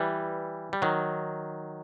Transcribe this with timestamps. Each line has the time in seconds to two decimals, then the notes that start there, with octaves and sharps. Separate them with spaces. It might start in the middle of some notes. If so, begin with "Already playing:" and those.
Already playing: E3 G3
0.73 G3
0.82 D#3 F#3